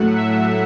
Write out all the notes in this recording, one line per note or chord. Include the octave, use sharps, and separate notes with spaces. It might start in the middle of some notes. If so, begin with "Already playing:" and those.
Already playing: A2 F#3 A3 F#5
E5